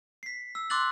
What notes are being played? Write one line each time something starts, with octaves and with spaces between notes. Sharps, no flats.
B6 C7
E6
C6 D6 E6 F#6 A6 F#7